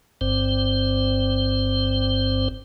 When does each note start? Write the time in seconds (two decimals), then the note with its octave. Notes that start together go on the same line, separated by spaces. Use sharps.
0.21 G1 G2 C4 C5